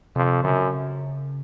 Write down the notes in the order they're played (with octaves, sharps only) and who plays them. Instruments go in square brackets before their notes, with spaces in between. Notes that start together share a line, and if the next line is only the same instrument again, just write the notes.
[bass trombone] F2 [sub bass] C3
[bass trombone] F#2 [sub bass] C#3